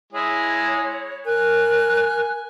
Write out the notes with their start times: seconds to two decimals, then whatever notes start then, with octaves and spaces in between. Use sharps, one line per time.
0.13 G#3 E4 G#4 C#5
1.26 A#4 G#5 F#6